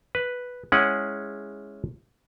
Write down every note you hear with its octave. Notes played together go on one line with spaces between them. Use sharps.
B4
G#3 C#4 E4 G#4 F#5